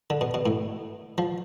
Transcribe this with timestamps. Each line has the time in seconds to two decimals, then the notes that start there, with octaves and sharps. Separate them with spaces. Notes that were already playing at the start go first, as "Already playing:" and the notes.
0.10 D3
0.21 B2
0.34 B2
0.46 A2
1.18 F3